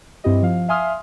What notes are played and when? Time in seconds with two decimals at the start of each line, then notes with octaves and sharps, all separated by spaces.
0.24 G2 C4 E4 G4 D#5
0.42 F3 F5
0.68 E5 F5 G#5 C6 D#6 F6